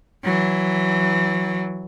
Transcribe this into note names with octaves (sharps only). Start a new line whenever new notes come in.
E3 F#3